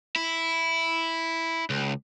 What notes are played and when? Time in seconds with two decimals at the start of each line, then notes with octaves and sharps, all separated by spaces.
0.16 E4
1.70 C#2